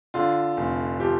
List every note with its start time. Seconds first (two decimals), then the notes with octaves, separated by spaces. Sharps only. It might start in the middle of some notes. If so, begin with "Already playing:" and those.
0.14 D3 F4
0.57 F1
1.00 F3 G4